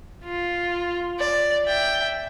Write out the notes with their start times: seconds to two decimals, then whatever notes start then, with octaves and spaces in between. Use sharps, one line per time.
0.24 F4
1.19 D5
1.66 E5 G5